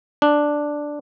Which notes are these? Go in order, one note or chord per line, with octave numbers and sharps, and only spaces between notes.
D4